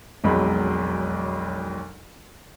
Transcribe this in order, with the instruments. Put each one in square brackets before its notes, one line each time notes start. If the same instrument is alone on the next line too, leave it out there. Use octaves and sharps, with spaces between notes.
[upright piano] E1 B1 F2 F#3 G#3 B5